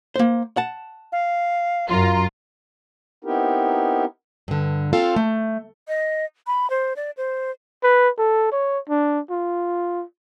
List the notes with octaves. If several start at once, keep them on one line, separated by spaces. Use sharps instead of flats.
A#3 C5
F#5 A5
F5
F#2 F4 A#5
B3 C4 D#4 E4 G4 A#4
G2 D3
C4 F4 A4 F5
A3
D#5
B5
C5
D5
C5
B4
A4
C#5
D4
F4